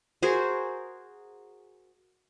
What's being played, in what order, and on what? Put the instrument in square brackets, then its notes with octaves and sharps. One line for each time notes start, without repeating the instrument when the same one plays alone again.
[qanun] F#4 G#4 A#4 C5